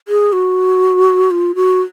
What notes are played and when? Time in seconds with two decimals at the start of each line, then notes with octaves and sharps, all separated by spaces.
0.08 G#4
0.33 F#4
1.31 F4
1.55 F#4